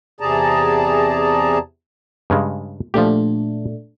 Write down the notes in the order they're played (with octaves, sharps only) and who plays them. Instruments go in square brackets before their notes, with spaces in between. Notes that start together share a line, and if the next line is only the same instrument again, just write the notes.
[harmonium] E2 C3 G#4 D5 A5 A#5
[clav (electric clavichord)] G2 C#3 G#3
[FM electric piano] A#2 A3 D4 [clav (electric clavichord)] F3 G4